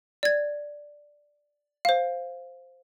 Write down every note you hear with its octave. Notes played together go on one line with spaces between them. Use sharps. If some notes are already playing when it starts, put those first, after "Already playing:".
D5 G#6
C5 F5